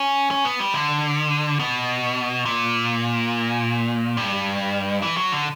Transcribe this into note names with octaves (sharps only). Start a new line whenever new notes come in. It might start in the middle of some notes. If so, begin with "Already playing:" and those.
Already playing: C#4
C#4
B3
G3
D3
B2
A#2
G2
E3
F#3
D3